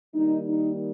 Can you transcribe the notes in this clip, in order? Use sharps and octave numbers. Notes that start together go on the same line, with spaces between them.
D#3 G3 A#3 D#4
D#4